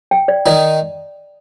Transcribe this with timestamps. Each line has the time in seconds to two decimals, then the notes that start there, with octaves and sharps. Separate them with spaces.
0.11 G5
0.28 D5
0.46 D#3 D#4 D5